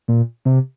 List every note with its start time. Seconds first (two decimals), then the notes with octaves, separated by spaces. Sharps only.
0.08 A#2
0.45 C3